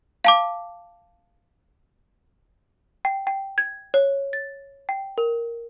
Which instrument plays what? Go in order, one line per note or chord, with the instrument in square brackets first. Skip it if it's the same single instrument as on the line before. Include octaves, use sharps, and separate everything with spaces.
[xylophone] F5 A5 D6
G5
G5
G#6
C#5
A6
G5
A#4